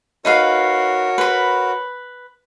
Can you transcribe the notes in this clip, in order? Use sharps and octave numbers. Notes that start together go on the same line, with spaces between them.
D#4 F#4 A#4 B4 C#5 F5
B4 B5